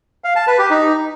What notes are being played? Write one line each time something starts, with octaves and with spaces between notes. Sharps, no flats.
F5
A5
B4
G4
D#4